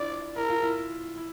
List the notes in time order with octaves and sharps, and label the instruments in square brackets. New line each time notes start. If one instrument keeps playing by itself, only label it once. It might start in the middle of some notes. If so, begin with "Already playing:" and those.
Already playing: [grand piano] D4 E4 F4 [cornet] D5
[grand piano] E4 [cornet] A#4
[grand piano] F4
E4
E4